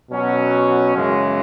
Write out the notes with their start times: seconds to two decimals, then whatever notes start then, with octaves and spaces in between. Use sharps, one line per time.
0.11 B2 F#3 C#4 F#4
0.96 F#2 C#3 E3 G#3